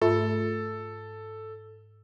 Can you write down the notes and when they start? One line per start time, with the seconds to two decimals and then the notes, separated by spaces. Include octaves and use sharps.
0.02 G#2 A3 F4 A4